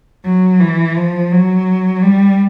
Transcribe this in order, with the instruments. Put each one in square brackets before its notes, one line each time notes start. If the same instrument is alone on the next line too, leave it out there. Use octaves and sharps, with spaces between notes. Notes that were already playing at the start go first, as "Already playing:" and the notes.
[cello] F#3
E3
F3
F#3
G3